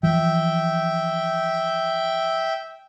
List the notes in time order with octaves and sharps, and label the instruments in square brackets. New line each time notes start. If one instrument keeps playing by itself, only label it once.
[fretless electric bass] E3 F3 [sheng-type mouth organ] E5 G5